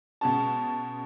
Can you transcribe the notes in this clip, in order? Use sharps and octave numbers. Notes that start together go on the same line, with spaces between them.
B2 G#3 C#4 A5